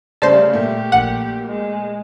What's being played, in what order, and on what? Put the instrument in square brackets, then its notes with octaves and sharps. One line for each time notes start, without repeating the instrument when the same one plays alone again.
[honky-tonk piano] C#3 G3 A3 [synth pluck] C5 A5 [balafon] D5
[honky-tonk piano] A#2 G3 A3 [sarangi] G4
[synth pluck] A#1 F#5
[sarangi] G#3